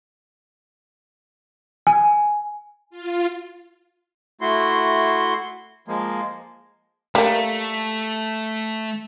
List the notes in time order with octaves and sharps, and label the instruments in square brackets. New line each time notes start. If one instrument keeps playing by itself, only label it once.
[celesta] G#5
[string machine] F4
[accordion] A3 E4 F#4 C6
F3 G#3 A#3
[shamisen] G3 A#3 [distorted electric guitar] A3